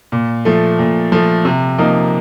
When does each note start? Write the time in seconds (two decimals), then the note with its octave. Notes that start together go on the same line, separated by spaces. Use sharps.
0.12 A#2
0.45 F3 A3
0.79 A#2
1.12 F3 A3
1.45 C3
1.78 F3 A#3 D#4